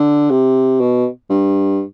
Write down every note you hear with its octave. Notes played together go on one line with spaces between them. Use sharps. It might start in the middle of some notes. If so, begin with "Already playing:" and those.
Already playing: D3
C3
B2
G2